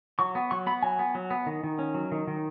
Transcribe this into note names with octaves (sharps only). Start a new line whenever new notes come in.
F#3 C#6
B3
F#3 C#6
B3 B5
F#3 G#5
B3
F#3
B3
D#3
D#3
C#4
F#3
D#3
D#3